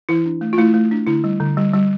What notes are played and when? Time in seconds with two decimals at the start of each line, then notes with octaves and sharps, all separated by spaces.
0.09 E3 E4
0.26 D4
0.41 A3
0.53 F4
0.58 A3 E4
0.74 A3
0.91 D4
1.07 D3 E4
1.24 G3
1.40 D3
1.57 G3
1.73 G3